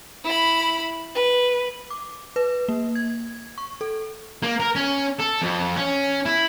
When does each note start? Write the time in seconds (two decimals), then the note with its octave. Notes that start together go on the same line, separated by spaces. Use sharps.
0.24 E4 B5
1.14 B4
1.90 D6
2.36 B4
2.69 A#3
2.95 G#6
3.58 C#6
3.81 A4
4.43 A#3
4.60 A#4
4.75 C#4
5.19 A4
5.42 F2
5.76 C#4
6.25 E4